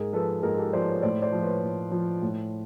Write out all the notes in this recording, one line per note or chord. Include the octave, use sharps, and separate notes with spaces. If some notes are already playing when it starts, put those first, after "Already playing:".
Already playing: G#2 G#4 A#4
F3 A4 B4
G#2 G#4 A#4
G4 A4
F3 C5 D5
B4 C#5
A2 C5 D5
C5 D5
F3
B4 C#5
A2
F3
A2